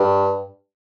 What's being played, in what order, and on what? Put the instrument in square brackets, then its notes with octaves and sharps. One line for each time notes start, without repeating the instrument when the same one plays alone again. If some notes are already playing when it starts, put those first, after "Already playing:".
Already playing: [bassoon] G2